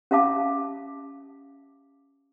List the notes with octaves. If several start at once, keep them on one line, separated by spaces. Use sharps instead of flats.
C#4 G4 E5 F5 A5 D6